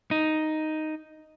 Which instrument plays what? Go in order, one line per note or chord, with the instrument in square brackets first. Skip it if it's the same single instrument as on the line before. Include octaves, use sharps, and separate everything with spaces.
[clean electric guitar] D#4